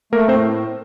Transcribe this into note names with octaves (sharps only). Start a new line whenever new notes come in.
A3 A#3 A#4
A2 C4 C5